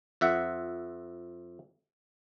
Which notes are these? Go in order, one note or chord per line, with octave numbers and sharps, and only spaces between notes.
F2 E5 F#5